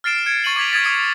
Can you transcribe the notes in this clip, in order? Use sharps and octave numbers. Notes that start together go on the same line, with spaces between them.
F6 A6 C7 D7 E7
G#6 C#7 D7
C#6 A6 D#7 F#7
D6 G#6 B6 F7
D#6 G#6 A6 B6
D#6 G#6 C#7